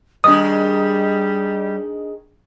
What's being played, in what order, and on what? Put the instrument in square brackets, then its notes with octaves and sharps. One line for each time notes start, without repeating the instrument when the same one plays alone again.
[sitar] D#3 G#3 [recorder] G3 [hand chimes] D4 D#5 [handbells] D#6